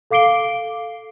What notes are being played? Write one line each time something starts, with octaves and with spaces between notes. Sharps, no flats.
A4 F5 D6 C7 D7 G7